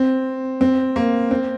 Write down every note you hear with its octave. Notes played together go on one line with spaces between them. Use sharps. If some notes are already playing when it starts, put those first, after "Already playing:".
Already playing: C4
C4
A#3
C4